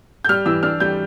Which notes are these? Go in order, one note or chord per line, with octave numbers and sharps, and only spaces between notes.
G6
G3 F6
E3 E6
D4 F6
G3 G6